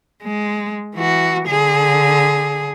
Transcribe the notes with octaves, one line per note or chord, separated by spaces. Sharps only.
G#3
E3 F#4
D3 G#4